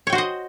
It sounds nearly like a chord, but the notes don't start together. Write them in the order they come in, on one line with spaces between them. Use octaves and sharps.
C#5 G5 F#4 C5 D#5